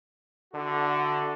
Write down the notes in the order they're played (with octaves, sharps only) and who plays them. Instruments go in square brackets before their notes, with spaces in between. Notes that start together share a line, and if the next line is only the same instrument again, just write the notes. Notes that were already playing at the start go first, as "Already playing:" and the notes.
[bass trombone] D3 [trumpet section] E4 F#4 A4